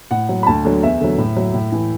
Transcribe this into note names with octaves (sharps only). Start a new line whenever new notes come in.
A2 F#5
F#3
B5
D2 A5
D3 F#3
E2 E5
D3 F#3
A2
F#3
A2
E3